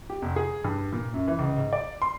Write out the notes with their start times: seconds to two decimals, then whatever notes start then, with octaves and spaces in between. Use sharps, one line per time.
0.10 G4
0.22 F1
0.36 G#4
0.64 G2
0.93 A#2
1.14 F#2
1.27 E3
1.39 C#2
1.57 G#2
1.73 D5
2.02 C6